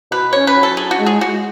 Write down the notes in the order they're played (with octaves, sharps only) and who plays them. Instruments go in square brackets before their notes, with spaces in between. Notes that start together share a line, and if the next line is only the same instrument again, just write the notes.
[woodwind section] B2 [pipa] B4
[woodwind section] C#4 [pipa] C#5
[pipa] B4
[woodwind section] F#3
[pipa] A4
[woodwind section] D4 [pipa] G#4
[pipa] F#4
[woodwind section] G#3
[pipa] G#4
[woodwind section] G#3 [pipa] F#4